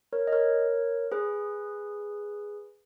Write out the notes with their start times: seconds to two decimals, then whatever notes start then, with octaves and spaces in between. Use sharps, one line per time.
0.13 A#4 C#5
0.27 D#5
0.32 A#4 C#5
1.12 G#4 B4